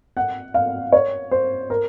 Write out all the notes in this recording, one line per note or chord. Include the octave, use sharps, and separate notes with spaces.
F#5
F5
C#5
C5
A#4